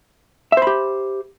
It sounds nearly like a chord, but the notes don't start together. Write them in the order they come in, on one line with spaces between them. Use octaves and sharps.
E5 C5 B5 G4